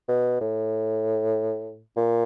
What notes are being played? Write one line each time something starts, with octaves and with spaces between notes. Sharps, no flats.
B2
A2
A#2